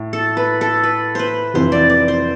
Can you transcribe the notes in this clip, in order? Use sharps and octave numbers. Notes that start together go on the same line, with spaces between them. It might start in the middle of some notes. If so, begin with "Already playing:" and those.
Already playing: A2
A4
B4
A4
B4
B4 C5
F1 F2 E3 C5
D5
D5
C5